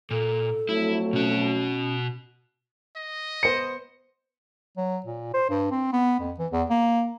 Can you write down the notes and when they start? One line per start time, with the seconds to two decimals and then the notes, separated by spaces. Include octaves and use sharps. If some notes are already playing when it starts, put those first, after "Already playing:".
0.11 A#2 A4
0.69 F2 F#3 A3 E4
1.13 B2 C#4 F#4
2.96 D#5
3.43 B3 C5 C#7
4.77 F#3
5.06 A#2
5.34 C5
5.50 G2
5.71 C4
5.93 B3
6.20 F2
6.39 E3
6.52 E2
6.70 A#3